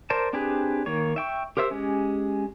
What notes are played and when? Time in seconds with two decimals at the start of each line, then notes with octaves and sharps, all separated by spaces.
0.10 A#4 C5 D5 A5
0.33 C4 D4 G4 G#4 B4
0.86 D#3 A#3 C#5
1.16 E5 G5 C#6
1.57 G4 A#4 C5 E5 E6
1.70 G#3 C#4 G4